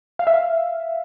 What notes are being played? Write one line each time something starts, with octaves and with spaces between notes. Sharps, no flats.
F5
E5
F5